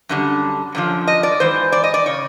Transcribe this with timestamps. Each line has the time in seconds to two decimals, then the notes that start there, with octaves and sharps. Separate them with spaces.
0.09 F#2 D3 G3
0.75 F#2 D3 F3
1.08 D#5
1.23 D5
1.40 G#2 E3 C5
1.72 D5
1.84 D#5
1.94 D5
2.06 C#3 C#5